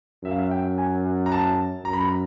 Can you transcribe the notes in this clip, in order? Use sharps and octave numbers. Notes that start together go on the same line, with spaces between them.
F#2 E5
F5
E5
G5
G#5
A#5
A5
F#2 A#5
B5
A#5